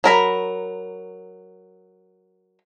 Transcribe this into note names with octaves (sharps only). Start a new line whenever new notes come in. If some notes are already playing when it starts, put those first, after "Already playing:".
F#3 A#4 B5